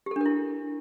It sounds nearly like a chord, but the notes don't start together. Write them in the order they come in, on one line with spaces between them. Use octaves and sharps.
G4 A4 D4 A#4 E4